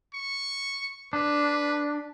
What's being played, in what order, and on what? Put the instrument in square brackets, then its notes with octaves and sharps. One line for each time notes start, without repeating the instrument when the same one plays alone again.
[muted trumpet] C#6
[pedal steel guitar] D4 [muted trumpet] B4